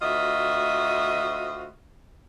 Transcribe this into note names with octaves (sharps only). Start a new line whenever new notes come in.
D2 F4 F#4 D#5 E5